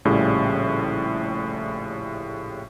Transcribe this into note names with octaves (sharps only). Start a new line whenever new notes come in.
A#1 A2 C#3 G3